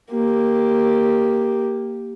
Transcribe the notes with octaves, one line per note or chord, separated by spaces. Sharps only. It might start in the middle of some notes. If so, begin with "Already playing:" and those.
A#3 G4